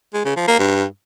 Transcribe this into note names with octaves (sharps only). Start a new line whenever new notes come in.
G#3
C#3
F3
A#3
G2